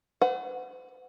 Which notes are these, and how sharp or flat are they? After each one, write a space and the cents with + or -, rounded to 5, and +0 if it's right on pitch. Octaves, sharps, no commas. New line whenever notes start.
C5 -45 F#5 -5